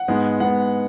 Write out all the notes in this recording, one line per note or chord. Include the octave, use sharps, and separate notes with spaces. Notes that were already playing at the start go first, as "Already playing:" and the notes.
Already playing: F#5
G#2 G#3 B3
G#2 G#3 B3 F#5